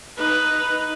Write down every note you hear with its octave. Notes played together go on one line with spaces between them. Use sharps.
D#4 B4